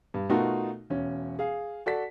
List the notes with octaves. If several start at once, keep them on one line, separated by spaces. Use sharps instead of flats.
G2
B2 A3 D#4 F4 F#4 A#4
E1 C#4
G#4 F5
F#4 A4 D5 B6